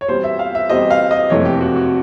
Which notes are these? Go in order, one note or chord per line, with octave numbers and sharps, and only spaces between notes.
C#5
E2 B2 G3 C4 C5
E5
F5
E5
E2 B2 G3 C4 D#5
F5
D#5
F#1 F2 C3 E3 A3 C#5
G4
F#4
F#4